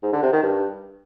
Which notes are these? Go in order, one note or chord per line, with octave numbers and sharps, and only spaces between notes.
G#2
D3
C3
D#3
G2